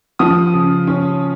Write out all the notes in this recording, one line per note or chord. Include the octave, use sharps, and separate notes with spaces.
F3 D#6
C#3
C#4